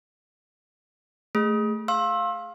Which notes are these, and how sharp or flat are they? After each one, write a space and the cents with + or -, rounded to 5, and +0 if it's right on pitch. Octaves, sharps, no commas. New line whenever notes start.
A3 +0 G#4 -10
F5 +5 C6 +35 E6 +0